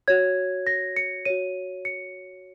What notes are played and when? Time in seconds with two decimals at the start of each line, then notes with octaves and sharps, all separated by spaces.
0.08 F#4 C#5 G#6
0.67 A#6
0.96 C#7
1.25 F#4 C#5 D#7
1.85 C#7